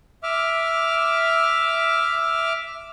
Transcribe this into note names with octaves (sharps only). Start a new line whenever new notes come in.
E5 D6 F6